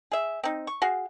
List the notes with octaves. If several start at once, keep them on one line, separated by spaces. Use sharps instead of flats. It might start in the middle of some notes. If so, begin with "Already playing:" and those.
G#4 E5
C4 D#4
C#6
F#4 G#4 F5